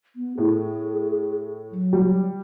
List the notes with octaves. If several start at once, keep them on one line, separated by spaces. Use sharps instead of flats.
B3
A2 G#4
F#3
G3